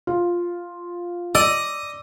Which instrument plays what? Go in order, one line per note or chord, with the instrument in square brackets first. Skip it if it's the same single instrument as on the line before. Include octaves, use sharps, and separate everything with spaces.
[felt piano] F4
[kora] D5 [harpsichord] D#5 [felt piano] E6